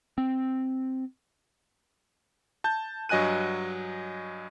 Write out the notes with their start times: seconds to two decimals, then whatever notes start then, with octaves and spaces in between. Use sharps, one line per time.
0.18 C4
2.64 A5 G6
3.09 G2 F#3 D#5 G#5 F#6 D#7